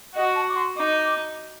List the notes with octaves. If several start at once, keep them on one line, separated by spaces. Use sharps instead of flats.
F#4 D#5
A5
D6
C6
D#4 D6